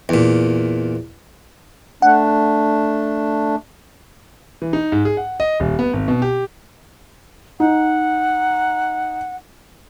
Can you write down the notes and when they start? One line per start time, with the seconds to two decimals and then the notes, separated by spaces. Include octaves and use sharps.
0.09 E2 A#2
2.02 A3 D4 F#5
4.62 E3
4.73 D#4
4.92 G#2
5.05 G#4
5.17 F#5
5.40 D#5
5.60 D#1
5.79 B3
5.93 G#1
6.08 B2
6.22 G4
7.60 D#4 F#5